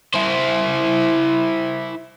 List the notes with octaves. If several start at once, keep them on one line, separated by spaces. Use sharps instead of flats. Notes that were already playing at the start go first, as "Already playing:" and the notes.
E4 C5